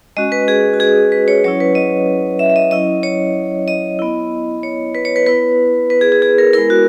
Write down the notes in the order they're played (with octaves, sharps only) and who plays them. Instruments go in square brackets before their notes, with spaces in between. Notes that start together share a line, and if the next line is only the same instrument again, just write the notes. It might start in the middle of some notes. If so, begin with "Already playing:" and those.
[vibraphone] G#3 C#4 F#4 D#5
B4
G#4
F#4
G#4
B4
C#5
F#3 C#4 E4 C#5
B4
D#5
E5
E5
D#5
F#3 C#4 E4 D#5
C#5
D#5
B3 E4
C#5
B4
C#5
B4
B3 E4 B4
B4
G#4
G#4
G#4
A#4
G#3 B3 E4 A#4
F#4